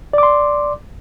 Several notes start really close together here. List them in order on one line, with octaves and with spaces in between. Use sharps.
D5 D6 C6